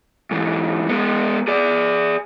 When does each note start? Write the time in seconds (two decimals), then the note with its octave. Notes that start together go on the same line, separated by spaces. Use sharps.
0.31 G#2 E3
0.89 G#3 B3
1.48 G#4 D5